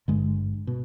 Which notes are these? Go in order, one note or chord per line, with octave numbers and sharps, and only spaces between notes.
G#1 G2 D3 G#3
B2